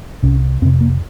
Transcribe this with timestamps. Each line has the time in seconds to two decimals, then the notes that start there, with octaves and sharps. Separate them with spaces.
0.23 C2 C3 C#4
0.62 F2 C4
0.65 C3
0.81 A#3